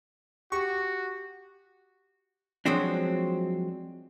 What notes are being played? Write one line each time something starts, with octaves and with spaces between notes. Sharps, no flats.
F#4 G4 C#6
F3 F#3 G#3 C4 D4